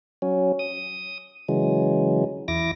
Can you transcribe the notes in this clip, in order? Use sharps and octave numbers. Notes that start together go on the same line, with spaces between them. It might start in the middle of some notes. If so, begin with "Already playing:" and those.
F#3 C#4
D#6
C#3 E3 F#3 G#3
E2 E4 D6 A#6